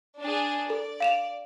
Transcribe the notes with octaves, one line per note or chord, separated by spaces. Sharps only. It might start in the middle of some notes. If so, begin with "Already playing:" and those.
D4 G#4
A4 D5
F5 E7 F7